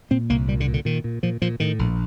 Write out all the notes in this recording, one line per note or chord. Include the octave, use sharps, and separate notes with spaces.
A#2 C4
C2 A#3
A#2 G3
D3
A#2
D3
A#2 D#3
A#2
A#2 F3
A#2 F3
A2 D#3
A#1